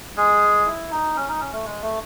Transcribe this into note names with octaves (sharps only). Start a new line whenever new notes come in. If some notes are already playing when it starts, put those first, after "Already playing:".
G#3 G#4
E4
D#4
C#4
D#4
C#4
A3
G#3
A3